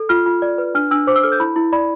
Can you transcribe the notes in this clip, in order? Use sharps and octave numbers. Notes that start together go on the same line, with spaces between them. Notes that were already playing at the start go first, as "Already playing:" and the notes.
Already playing: A4
F4 F6
F4
D5
B4
D4 F6
D4 E6
C5 D6
E6
A4 F6
G6
E4 B5
E4
D5 B5